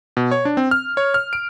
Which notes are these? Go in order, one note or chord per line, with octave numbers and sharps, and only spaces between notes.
B2
C#5
D4
C4
F6
C#5
F6
D7